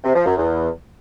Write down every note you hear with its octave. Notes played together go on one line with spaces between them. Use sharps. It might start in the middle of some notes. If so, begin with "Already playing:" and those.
C3
F3
F#2
E2